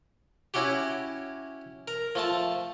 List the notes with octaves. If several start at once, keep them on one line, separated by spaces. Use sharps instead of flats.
C#4 E4 F#4 G4
A#4
F3 A3 A5